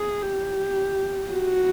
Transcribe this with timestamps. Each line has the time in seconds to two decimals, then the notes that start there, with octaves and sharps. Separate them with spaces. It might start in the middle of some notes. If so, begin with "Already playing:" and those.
Already playing: G#4
0.22 G4
1.31 F#4